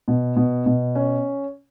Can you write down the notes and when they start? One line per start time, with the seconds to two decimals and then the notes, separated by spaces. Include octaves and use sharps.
0.08 B2
0.36 B2
0.66 B2
0.95 C#4